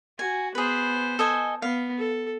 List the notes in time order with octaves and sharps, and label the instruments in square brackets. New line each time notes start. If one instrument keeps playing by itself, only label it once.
[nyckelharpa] F#4 [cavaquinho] G#5
[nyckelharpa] B3 C5 [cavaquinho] G#4 B4
[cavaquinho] A4 D#5 G#5
[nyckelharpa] B3 [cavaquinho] F5
[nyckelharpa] A4